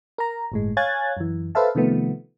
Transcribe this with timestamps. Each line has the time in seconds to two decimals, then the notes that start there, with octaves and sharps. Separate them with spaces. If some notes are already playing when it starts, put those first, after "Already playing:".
0.18 A#4 A#5
0.52 G1 A2 G#3
0.77 C#5 F5 G#5 F#6 G#6 A6
1.17 F#2 E3
1.55 A4 B4 C5 E5 F5 A5
1.75 C3 D#3 F3 A3 B3